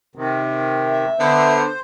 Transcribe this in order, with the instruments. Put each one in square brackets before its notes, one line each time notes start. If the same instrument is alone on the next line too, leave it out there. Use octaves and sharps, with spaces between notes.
[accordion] C3 D#3
[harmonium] E5
[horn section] D3 B3 [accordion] C5